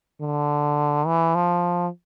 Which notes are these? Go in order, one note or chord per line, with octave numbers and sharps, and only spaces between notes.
D3
E3
F3